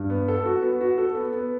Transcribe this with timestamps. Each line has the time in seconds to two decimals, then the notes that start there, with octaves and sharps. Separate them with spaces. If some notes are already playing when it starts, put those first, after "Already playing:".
Already playing: G2
0.10 B3
0.28 A4
0.45 F#4
0.62 B3
0.81 F#4
0.98 A4
1.15 B3
1.33 B3